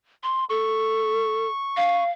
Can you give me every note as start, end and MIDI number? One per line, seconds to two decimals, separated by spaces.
0.23 0.45 84
0.50 1.47 69
0.50 2.04 85
1.77 2.10 77